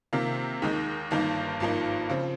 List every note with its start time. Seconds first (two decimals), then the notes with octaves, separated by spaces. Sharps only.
0.13 C3 D#3 A#3 F4
0.62 D#2 D#3 G#3 D#4
1.11 G1 G2 D#3 A#3 D#4
1.60 G#1 G2 F3 A#3 D#4
2.10 C#3 F3 C4